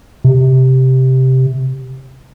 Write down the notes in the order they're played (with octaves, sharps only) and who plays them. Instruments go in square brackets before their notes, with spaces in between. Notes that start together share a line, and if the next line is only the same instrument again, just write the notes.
[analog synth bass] C3